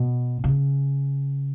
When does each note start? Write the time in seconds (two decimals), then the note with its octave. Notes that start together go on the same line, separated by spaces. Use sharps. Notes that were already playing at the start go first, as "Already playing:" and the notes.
Already playing: B2
0.44 C#3